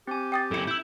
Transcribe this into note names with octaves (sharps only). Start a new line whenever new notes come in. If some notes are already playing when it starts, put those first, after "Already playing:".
C4 G4 G#5
G5 D#6 A6
F#2 E4 A4 C#7
E4 E6 G6